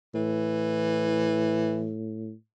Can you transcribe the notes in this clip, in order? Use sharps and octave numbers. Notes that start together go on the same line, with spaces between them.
A2 E3